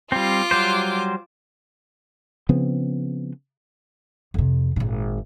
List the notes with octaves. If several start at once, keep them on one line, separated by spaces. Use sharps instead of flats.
G3 C4 F4 D6
F#3 G3 C5
C#3 F3 B3 C4
F2 C3
G#1 A#2